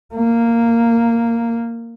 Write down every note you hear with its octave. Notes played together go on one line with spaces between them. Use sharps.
A#3